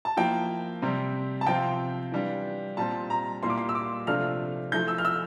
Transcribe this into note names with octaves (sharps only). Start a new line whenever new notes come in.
A5
F3 A#3 E4 G5
C3 G3 C4
A5
C3 F3 C4 F4 G5
E3 G3 D4 F4
A#2 G3 C4 A5
A#5
A#2 G3 A#3 E4 C6
D6
C6
E6
D6
C3 F3 A3 D4 F4 F6
F3 A3 E4 G6
E6
F6
E6